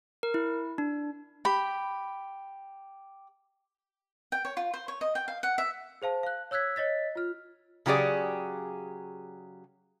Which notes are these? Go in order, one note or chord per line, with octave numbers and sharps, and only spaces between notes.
A#4
E4
D4
G4 B5
G5
C#5
F4
C5
C#5
D#5
G5
F5
F#5
E5
G#4 C5 F5 A5
F5 F#6
C#5 E6 F#6 G#6 B6
C#5 D#5 A6 B6
F4 F6
C#3 F#3 G4 G#4 D5